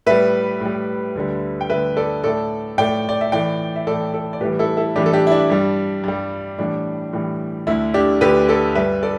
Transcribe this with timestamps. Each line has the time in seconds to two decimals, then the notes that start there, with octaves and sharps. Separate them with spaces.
0.06 A2 G3 B4 E5
0.61 A2 G3
1.15 D2 D3 G3
1.61 G5
1.69 D2 D3 G3 B4 E5
1.97 A4 D5
2.24 A2 A3 A4 D5
2.78 A2 A3 D5 G5
3.09 D5
3.21 E5
3.32 A2 E3 A3 D5 G5
3.76 E5
3.87 A2 E3 A3 A4 D5
4.14 A4 D5
4.33 D5
4.41 A2 E3 G3 G4 B4
4.59 E4 A4
4.77 E4 A4
4.95 A2 E3 G3 D4 G4
5.06 A4
5.13 D4 G4
5.27 E4
5.32 D4
5.50 G2 G3
6.04 G2 G3
6.58 A2 E3 G3 D4
7.13 A2 E3 G3
7.67 D2 D3 A3 E4
7.94 D4 G4
8.21 D2 D3 A3 G4 B4
8.48 A4 D5
8.75 G2 G3 B4 E5
9.03 A4 D5